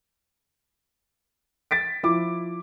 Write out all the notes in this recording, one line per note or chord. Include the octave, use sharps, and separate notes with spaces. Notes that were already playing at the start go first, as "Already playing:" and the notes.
A6 B6 D7
F3 E4 D6